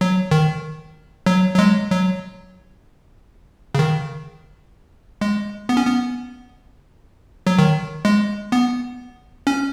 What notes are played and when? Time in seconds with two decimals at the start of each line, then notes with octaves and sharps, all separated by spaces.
0.01 F#3
0.31 D#3
1.26 F#3
1.54 F#3
1.59 G#3
1.90 F#3
3.75 C#3
3.79 D#3
5.21 G#3
5.69 B3
5.77 C#4
5.86 B3
7.47 F#3
7.59 D#3
8.05 G#3
8.52 B3
9.47 C#4